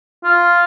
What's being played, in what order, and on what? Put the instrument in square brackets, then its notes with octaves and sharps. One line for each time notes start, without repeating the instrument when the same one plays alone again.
[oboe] F4